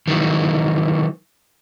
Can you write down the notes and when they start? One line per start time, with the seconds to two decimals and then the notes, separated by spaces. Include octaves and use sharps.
0.08 D#3 E3 F#3 G#3